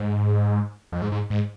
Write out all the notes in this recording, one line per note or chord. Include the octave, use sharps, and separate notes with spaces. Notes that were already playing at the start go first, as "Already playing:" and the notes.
Already playing: G#2
F2
G#2
G#2
G#2